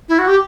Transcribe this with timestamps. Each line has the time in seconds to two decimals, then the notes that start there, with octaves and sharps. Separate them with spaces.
0.09 E4
0.19 F#4
0.28 G4